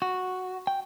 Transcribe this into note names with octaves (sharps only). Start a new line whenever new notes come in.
F#4
G5